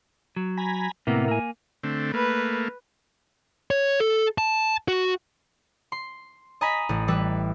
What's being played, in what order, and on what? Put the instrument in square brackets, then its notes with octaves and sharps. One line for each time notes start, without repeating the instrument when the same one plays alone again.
[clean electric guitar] F#3
[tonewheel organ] G#5 A#5 B5
[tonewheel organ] A2 E4 A#4 [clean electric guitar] C3 A#3 B3
[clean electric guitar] A#3 G#5
[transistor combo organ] D3 A3 C4
[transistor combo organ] A3 A#3 [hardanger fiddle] B4
[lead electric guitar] C#5
A4
A5
F#4
[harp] C6
D#5 G#5 A#5 B5 B6
A1
E3 G3 B4 E6